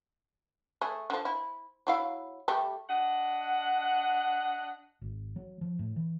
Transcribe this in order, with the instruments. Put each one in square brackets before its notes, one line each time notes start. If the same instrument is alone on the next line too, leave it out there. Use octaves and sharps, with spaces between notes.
[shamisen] A3 G#4
D3 F3
E4
F#3 E4 F5
G3 A3 G4
[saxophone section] D4 D#5 F#5
[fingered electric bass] G#1
F#3
F3
A2
E3